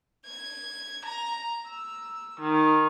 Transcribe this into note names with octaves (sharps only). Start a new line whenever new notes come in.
G#6
A#5
E6
D#3